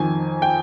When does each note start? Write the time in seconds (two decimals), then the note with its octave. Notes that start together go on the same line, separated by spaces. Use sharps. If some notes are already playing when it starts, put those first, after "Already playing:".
Already playing: F2 D#3 G#5
0.42 G5